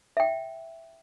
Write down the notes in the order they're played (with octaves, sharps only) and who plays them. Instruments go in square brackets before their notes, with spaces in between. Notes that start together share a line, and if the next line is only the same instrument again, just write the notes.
[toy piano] E5 G5